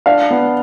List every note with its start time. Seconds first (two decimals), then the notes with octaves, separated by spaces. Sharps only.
0.06 D4 F5
0.30 B3